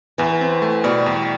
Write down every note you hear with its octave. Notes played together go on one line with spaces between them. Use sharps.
E2 E3
C4
A3
B2 G3
E2